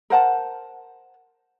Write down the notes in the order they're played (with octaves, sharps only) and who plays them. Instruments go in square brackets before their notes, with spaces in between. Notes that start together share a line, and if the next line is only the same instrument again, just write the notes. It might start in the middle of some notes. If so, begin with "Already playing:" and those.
[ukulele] A#4 C5 F#5 A5